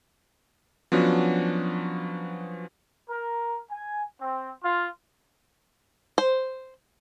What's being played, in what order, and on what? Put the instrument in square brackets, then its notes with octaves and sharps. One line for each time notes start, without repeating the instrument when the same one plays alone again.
[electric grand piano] F3 F#3 B3 C#4 D4 F#4
[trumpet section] A#4
G#5
C4
F4
[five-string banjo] C5